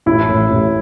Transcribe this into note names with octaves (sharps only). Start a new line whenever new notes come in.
A1 E4
A2
A1